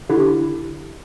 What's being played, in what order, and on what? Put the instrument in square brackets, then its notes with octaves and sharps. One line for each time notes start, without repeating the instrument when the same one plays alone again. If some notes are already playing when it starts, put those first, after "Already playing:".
[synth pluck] D3 D4 E4 G4